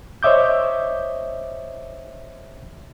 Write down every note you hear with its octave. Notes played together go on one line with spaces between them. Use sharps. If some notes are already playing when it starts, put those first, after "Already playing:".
C5 C#5 D#5 E5 D6 G6